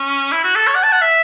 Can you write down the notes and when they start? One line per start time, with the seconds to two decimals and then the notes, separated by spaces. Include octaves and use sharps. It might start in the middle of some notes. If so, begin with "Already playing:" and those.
Already playing: C#4
0.32 E4
0.44 F#4
0.55 A4
0.67 C#5
0.75 F#5
0.83 A5
0.92 F#5
1.01 E5